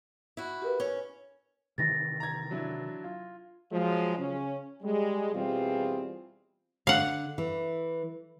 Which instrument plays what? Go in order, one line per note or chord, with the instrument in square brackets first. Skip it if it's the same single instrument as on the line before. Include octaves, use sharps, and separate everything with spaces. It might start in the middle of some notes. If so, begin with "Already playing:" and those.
[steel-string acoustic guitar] E4 F#4
[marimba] G4 A#4 B4
[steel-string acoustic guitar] C#4
[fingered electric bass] C3 D#3 E3 [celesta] A6 A#6
[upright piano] A#5 G#6
F#3 D4 E4
F4
[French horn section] F3 F#3 G#3
C#3 C#4
G3 G#3
B2 E3 G3 C4 F4 G#4
[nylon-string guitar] D3 [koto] F5 F#5
[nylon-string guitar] E3